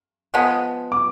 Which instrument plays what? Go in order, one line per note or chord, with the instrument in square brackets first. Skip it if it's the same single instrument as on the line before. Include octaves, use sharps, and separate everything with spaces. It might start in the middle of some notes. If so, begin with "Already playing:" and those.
[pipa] F3 G#3 B3
[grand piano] D6